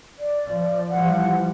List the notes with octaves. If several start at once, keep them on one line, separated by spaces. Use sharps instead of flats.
D5
F3
E3 F3 G3 F#5